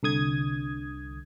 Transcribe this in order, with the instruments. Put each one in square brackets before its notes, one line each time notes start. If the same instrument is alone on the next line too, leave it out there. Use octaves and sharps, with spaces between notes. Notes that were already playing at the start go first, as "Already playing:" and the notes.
[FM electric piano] C2 D3 D#6 G#6